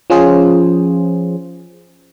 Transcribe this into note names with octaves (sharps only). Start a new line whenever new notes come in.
F3 C#4 F4 G#4 C5